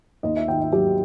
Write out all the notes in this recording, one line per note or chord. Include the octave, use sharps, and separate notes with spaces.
D#2 D#5
E5
D#3 G5
E5
F#3 G4